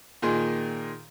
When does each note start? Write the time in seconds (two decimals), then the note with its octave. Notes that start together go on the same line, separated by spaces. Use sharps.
0.22 A#2 D#3 G#4 C6